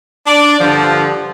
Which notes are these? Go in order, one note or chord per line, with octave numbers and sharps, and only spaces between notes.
D4 D5
G2 D3 F3